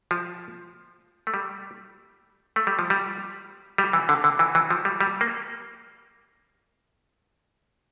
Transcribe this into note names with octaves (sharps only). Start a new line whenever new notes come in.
F3
A3
G3
A3
G3
F3
G3
G3
E3
D3
D3
E3
E3
F3
G3
G3
A#3